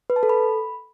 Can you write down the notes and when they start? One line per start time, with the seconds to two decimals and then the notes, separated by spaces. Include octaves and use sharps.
0.10 B4
0.16 A5
0.23 A4
0.29 B5